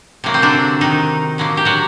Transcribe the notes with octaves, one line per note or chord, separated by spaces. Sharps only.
C3 F#3 A#3
C4
D3 D4
D#3 D#4
D3 F#3 A#3
G4
F#3 F#4